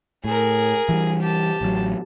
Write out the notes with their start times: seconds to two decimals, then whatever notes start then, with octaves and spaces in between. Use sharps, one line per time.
0.24 A2 G#4 A#4
0.89 E3 F#3 G3
1.21 G4 A5
1.61 A1 F#3